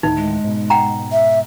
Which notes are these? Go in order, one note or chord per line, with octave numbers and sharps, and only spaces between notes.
D2 A2 D#3 D#4
G#3
G#2 B2
F#5 G5 A#5
E5